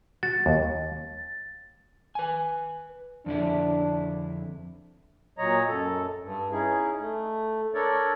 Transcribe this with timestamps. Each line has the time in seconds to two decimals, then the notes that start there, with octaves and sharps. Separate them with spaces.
0.23 F#4 A6
0.46 D#2
2.15 B4 G#5
3.26 F2 D3 D4 E4
5.38 A#2 F#3 C#5 D#5 A#5
5.68 F#2 A4
6.22 G2
6.52 C#4 D#4 E4 G#4
6.99 A3
7.75 D4 A4 A#4 C#5 D5